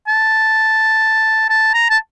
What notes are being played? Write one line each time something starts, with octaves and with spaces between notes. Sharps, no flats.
A5
A5
A#5
A5